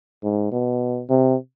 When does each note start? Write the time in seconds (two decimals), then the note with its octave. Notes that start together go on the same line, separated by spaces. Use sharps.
0.23 G#2
0.52 B2
1.10 C3